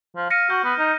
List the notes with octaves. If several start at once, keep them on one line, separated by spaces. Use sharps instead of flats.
F3
F5 A#6 C#7 D#7
F#4 F6 G6
B3
D#4